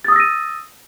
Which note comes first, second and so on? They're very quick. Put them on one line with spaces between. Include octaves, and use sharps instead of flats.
A6 D#6 E6 A#6 D#7